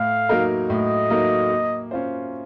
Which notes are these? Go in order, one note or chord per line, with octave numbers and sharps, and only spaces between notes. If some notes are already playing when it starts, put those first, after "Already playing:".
Already playing: A2 F5
F#3 A#3 D#4 A#4
A2 D#5
F#3 A#3 D#4 A#4
A#3
C#4 F4 C5